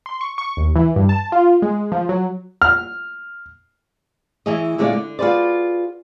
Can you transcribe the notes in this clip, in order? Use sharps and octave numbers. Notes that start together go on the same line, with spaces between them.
C6
C#6
C#6
D#2
E3
G2
A5
F4
G#3
F3
F#3
F6
E3 E4 G#4 C#5 D#5
A#2 D3 G#3 C#4 D5 F5
D3
F4 F#4 G#4 B4 C5 D5